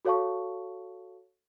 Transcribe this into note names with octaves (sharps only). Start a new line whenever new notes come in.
F#4 A4 C#5 F5 A5 C#6